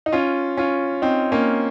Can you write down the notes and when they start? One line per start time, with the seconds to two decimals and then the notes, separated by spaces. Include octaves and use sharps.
0.06 D#4
0.12 C#4 F4
0.57 C#4 F4
1.02 C4 D#4
1.32 A#3 C#4